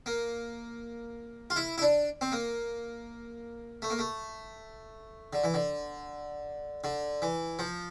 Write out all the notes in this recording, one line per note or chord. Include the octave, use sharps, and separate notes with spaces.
A#3
F4
E4
E4
D4
C4
A#3
A3
A#3
A3
D3
E3
D3
D3
E3
F3